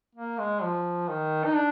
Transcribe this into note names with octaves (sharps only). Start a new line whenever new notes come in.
A#3
G#3
F3
D#3
D#4
D4